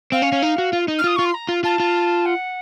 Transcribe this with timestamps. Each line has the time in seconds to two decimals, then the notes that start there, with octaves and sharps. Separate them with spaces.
0.12 C4 F5
0.22 C#4
0.32 C#4
0.42 D#4
0.58 F#4
0.73 F4
0.88 D#4
0.98 F6
1.04 F4 D#6
1.16 F4 C#6
1.25 C6
1.34 A#5
1.49 F4
1.64 F4 A5
1.80 F4
2.25 F#5